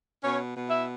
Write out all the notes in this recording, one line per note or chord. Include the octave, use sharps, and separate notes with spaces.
B2 C#4 C#5
B2
E4 E5